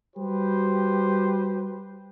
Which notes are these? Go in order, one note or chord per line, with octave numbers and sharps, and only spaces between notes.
G3 F#4 G4 B4 C5